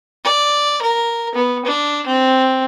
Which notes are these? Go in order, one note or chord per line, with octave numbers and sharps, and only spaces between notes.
D5
A#4
B3
D4
C4